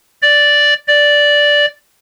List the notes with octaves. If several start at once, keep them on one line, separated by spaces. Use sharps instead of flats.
D5
D5